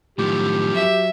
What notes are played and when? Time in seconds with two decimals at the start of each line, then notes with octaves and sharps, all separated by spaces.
0.19 F#2 A2 D#3 F3 G4
0.74 F#3 E5